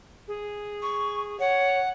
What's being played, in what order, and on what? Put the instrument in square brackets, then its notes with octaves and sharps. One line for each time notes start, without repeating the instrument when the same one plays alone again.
[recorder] G#4
[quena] C#6
[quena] C#5 [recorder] F#5